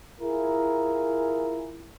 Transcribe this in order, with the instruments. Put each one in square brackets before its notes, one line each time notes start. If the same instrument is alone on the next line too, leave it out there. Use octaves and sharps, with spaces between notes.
[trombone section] E4 F4 G#4 A#4